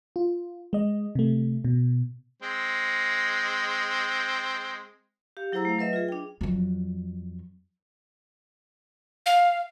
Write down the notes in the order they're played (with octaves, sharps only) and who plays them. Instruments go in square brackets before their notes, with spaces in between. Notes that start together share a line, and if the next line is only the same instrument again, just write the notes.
[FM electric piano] F4
G#3 D#5
C3 A3
B2
[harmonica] G#3 C4
[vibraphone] G4 F5
F#3 E4 G#4 C5 A#5 E6
A3 F5
F#3 B4 D#5 E5
F4 G#4
D4 G5
[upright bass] F2 F#3
[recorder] F5